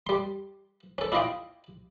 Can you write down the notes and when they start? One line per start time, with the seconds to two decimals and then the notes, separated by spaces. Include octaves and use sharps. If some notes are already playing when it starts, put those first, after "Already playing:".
0.07 G3 C6
0.98 C#4 A4
1.12 D4 E4 F4 D#5 F5 G5